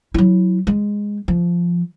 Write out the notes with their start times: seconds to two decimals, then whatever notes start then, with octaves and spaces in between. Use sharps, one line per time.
0.14 F#3 E4
0.67 G#3
1.28 F3